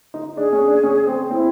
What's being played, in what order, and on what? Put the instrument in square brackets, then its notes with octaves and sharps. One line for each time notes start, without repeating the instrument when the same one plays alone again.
[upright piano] D#4
[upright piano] D4 [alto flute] G#4
[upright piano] C#4
D4
C#4
C4
[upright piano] C4 [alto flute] E4